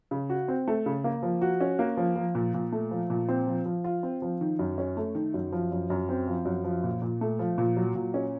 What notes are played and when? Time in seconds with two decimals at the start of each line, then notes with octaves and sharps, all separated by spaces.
0.11 C#3
0.29 F#4
0.48 C4
0.68 A3
0.86 C#3
1.04 A#3
1.23 F3
1.41 F#4
1.61 C#4
1.79 A#3
1.97 F3
2.16 F3
2.35 A#2
2.54 A#2
2.72 A3
2.91 F3
3.10 A#2
3.29 C4
3.47 F3
3.66 F3
3.84 F4
4.03 C4
4.22 F3
4.41 D#3
4.59 F#2
4.78 C#4
4.97 A3
5.15 D#3
5.34 F#2
5.52 F3
5.72 F#2
5.90 F#2
6.09 C4
6.27 F3
6.45 F#2
6.64 F3
6.84 A#2
7.02 A#2
7.21 A3
7.39 F3
7.58 A#2
7.77 F#3
7.95 A#2
8.14 C#4